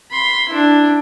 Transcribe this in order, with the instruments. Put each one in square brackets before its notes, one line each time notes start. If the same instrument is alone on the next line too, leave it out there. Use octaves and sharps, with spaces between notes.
[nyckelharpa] B5 C6
D4 E4